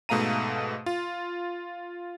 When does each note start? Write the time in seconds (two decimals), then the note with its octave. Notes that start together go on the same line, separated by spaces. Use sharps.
0.09 G#2 B2 A3 F5 A#5 D#7
0.86 F4